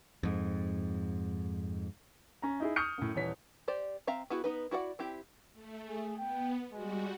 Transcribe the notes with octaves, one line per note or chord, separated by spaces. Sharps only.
F2 G#2
C#4 A#5
D#4 E4 G#4
C#6 D#6 F6 G6 C#7
F#2 A2
D#1 E3 C#5 B6
G4 C5 D5
C4 E5 F5 A#5
B3 E4 F#4 G#4
B3 D#4 B4
E4 F#4 D5 F#5
C4 E4 G4
A3
G#4
B3 G5
G3 G#3 F#4